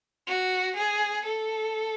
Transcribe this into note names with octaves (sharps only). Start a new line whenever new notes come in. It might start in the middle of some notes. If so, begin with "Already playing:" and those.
F#4
G#4
A4